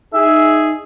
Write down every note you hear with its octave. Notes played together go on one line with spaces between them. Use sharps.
D#4 G#4 E5